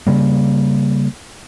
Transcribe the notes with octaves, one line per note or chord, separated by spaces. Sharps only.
C#3 G3 A#3